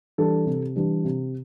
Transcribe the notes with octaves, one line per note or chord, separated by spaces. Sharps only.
E3 G3 D4 A4
C3
E3 G3 D4
C3